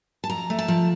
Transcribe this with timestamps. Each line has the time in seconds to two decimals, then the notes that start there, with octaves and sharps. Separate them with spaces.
0.24 A5
0.30 F2 A#5
0.50 A3
0.59 A5
0.68 F3